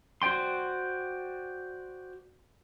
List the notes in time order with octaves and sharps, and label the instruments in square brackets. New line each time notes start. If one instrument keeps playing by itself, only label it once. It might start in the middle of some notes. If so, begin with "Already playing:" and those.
[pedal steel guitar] F#4 C5 D5 G5 C6